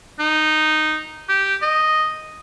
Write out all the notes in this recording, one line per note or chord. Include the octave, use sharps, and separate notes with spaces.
D#4
G4
D#5